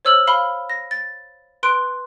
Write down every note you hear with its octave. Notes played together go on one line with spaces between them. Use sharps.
C5 C#5 E6 F6 F#7
F5 B5 F6 G7
A#6
A6
B4 C6 F#6 D7